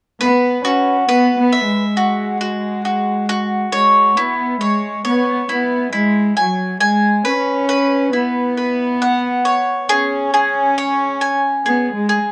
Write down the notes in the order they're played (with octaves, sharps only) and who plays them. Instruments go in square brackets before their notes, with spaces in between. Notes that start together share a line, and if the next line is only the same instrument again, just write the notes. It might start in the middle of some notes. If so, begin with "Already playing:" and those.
[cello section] B3 [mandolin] B4
[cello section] C#4 [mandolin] F#4
[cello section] B3 [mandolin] B4
[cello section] B3
[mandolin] E5
[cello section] G#3
[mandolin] F#4
F#4
F#4
F#4
[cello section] G#3 [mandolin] C#5
[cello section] B3 [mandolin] E4
[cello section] G#3 [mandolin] C#5
[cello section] B3 [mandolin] C#5
[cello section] B3 [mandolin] E4
[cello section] G#3 [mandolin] E4
[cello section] F#3 [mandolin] G#5
[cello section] G#3 [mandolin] G#5
[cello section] C#4 [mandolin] B4
[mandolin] B4
[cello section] B3 [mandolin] E4
[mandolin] B4
F#5
C#5
[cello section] C#4 [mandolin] G#4
[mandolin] G#4
C#5
G#5
[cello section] B3 [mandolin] G#4
[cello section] G#3
[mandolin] G#4